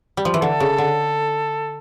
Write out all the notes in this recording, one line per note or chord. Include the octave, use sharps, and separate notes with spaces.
G3
F3
E3
D3 A4
C#3
D3